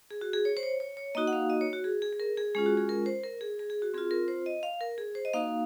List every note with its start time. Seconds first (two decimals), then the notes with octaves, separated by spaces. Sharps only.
0.11 G#4
0.21 F#4
0.33 G#4
0.45 C#5
0.57 C5
0.63 C#5
0.80 C#5
0.97 C#5
1.15 A#3 D#4 F#4 D#5
1.27 F#5
1.33 F5
1.50 D#5
1.61 C#5
1.73 F#4
1.84 G#4
2.02 G#4
2.13 G#4
2.20 A#4
2.38 G#4
2.55 G#3 C#4 F4 G#4
2.66 F#4
2.77 G#4
2.89 A#4
3.06 C5
3.24 A#4
3.41 G#4
3.59 G#4
3.70 G#4
3.82 F#4
3.94 C4 F4 G#4
4.11 A#4
4.28 C5
4.46 D#5
4.63 F5
4.81 A#4
4.98 G#4
5.15 C5
5.25 D#5
5.33 A#3 D#4 F#4 F5